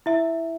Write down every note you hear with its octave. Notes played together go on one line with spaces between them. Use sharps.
E4 E5